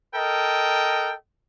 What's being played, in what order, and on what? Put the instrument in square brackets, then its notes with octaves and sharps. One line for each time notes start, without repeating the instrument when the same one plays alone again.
[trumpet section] A4 A#4 D#5 G5